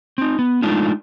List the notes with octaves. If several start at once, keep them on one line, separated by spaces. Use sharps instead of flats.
C4 D#4
B3
G#3 A3 D4 D#4 F4